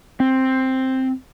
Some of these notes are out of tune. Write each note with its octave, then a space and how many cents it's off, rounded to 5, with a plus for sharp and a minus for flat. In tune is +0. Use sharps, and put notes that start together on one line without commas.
C4 +5